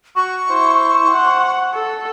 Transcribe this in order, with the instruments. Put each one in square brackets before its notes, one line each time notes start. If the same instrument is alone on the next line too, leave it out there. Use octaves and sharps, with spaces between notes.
[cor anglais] F#4 [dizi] C#6
[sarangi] E4 [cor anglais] C5
[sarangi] F#5
A4